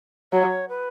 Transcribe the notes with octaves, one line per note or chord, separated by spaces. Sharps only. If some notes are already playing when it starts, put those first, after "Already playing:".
F#3 C#5
B4